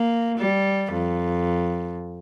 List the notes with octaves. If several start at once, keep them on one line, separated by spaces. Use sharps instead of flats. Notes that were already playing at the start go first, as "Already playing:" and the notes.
Already playing: A#3
G3
F2